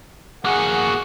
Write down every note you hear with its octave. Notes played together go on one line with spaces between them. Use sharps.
A#3 F#4 G#4 F#5